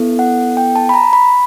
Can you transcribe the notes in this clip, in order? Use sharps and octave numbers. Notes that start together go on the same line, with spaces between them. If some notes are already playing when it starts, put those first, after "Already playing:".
Already playing: B3 E4 A4
F#5
G5
A5
B5
A#5
B5